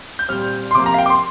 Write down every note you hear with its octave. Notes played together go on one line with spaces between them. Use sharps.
G6
A#2 G3 C4 F6
C6
C3 F3 A#3 D6
A#5
F5
G5
D6
C6